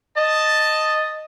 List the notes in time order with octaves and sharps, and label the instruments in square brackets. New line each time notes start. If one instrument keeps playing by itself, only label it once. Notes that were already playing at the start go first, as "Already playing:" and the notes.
[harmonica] D#5 [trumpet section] A5